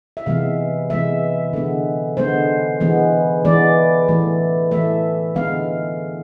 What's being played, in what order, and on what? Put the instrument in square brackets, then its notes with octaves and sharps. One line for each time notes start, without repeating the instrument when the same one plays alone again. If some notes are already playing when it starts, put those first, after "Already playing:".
[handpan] E5
C3 E3 G#3 B3 F5
C3 E3 G#3 B3 E5
D3 G#3 B3
D3 G#3 B3 C5
E3 G#3 B3
E3 G#3 B3 D5
E3 A3
E3 A3 E5
D3 G#3 B3 F5